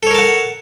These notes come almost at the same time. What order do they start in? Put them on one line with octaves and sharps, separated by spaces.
A4 C#5 A#4 A5 F#5